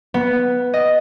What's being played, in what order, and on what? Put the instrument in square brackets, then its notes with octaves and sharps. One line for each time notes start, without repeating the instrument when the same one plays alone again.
[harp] B3
D#5